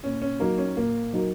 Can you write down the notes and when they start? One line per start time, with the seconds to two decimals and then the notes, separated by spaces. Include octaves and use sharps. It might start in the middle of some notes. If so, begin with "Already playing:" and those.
0.03 A#2 C#4
0.22 C#4
0.40 F#3 A#3 D#4 A#4
0.58 C#4
0.76 A#2 A#3
1.13 F#3 D#4 A#4